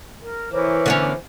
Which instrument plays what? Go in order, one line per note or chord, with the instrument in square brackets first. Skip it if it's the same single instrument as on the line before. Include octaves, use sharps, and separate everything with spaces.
[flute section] A#4
[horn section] E3 [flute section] A#4 C#5 D6 [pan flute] C5
[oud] D3 B3 C#4